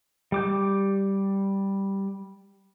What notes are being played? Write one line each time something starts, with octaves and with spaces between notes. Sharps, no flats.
G3 D6 G6